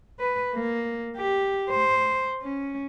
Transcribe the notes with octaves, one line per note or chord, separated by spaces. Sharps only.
B4
A#3
G4
C5
C#4